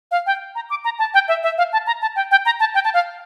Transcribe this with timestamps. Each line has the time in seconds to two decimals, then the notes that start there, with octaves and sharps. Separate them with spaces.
0.11 F5
0.26 G5
0.55 A#5
0.70 D6
0.85 A#5
0.99 A5
1.14 G5
1.28 E5
1.43 E5
1.58 F5
1.73 A5
1.87 A#5
2.02 A5
2.16 G5
2.31 G5
2.45 A#5
2.60 A5
2.74 G5
2.84 A5
2.94 F5